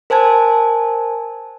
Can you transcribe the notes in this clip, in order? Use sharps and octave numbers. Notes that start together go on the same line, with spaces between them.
A#4 C5 G#5 A5 G#6